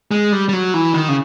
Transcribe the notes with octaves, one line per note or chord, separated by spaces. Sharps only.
G#3
G3
G3
F#3
E3
D#3
C#3